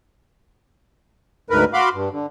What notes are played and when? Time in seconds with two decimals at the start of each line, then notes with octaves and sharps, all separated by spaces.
1.50 D2 G#2 A#4 B4
1.73 F#4 F5 B5 C6 D6
1.93 G2
2.12 D3